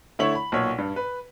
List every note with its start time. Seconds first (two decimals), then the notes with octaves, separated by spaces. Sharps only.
0.19 D3 A3 E4 C#5 F#7
0.35 B5
0.52 B1 A#2 C#5
0.78 G2
0.96 B4